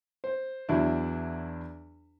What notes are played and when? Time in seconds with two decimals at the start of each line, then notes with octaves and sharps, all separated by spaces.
0.24 C5
0.69 E2 F#3 D4 E4